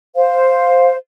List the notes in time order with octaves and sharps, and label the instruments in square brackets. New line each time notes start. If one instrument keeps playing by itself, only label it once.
[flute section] C5 F5